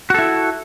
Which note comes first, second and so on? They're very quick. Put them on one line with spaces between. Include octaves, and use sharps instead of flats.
F#4 A4 E4